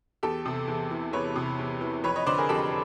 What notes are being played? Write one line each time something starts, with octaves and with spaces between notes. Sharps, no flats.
E2 G4 A4
C3
E2
E3
E2 B4 C#5
C3
E2
E3
F2 B4 C#5
C#5 D#5
D3 C5 D5
G#4 A#4
F2 G4 A4